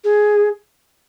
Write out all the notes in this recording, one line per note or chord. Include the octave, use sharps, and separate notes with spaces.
G#4